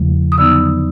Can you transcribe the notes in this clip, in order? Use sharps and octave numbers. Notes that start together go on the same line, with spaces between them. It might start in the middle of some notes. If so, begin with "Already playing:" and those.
Already playing: E2 C#3 F3 A3
D#6
D3 F#3 B3 D#4 E6